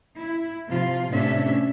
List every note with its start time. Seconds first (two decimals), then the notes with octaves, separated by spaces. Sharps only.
0.19 E4
0.69 C3 F3 F4
1.11 A2 C3 C#4 D4 E5